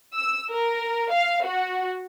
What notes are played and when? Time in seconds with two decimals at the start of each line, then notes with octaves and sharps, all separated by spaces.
0.15 E6
0.52 A#4
1.13 F5
1.46 F#4